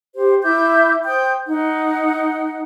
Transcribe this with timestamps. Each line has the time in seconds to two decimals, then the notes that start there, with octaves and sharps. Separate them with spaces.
0.15 G4 C5
0.43 E4 E5 D6 G6
1.06 C5 G5 D#6 G6
1.49 D#4 F#5